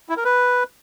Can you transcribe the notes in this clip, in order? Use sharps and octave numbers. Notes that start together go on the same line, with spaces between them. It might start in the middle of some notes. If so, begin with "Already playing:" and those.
E4
A#4
B4